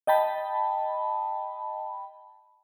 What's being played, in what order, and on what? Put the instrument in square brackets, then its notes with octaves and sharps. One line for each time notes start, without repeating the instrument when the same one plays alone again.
[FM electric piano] D#5 G5 A5 B5